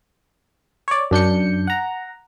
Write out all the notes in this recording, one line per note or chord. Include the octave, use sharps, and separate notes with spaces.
C#5 D5
F#2 D4 G6 C#7
F#5 A#5